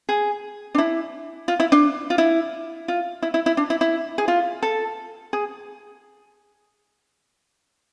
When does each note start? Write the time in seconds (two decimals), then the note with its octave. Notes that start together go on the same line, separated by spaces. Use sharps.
0.09 G#4
0.75 D4
0.78 E4
1.48 F4
1.60 E4
1.72 D4
2.10 F4
2.18 E4
2.88 F4
3.22 E4
3.34 E4
3.46 E4
3.57 D4
3.70 E4
3.81 E4
4.18 G#4
4.28 F4
4.63 A4
5.33 G#4